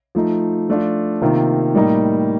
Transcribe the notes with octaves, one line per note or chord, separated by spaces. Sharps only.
F3 A3 D#4
F3 A3 D4 F4
C3 D#3 A#3 F4
A2 G3 A#3 D#4